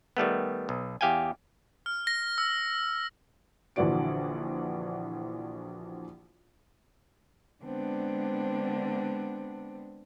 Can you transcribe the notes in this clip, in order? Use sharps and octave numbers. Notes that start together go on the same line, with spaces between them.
D#3 G3 A3 B3
B1
E2 G4 F5 G5 G#5
F6
A#6
E6
A#1 D3 E3 F#4 D5 D7
D3 G#3 B3 C4 D4